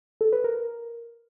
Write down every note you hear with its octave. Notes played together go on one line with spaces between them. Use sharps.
A4
B4
A#4